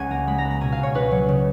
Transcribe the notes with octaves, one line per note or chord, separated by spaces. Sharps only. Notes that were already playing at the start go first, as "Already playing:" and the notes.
Already playing: C#2 C#4 F#5 G#5
A#3 A#5
G#3 B5
A#5
B3
A#5
B2 G#5
F5
B2 C#5
C#2 B4
F#3 C#5
C#3